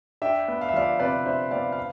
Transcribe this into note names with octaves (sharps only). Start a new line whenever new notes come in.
D4 E5 G5
B3
F5
E5
F3 D5 F5
C3 B4 D5
D4 C5 E5
B3 D5 F5
F5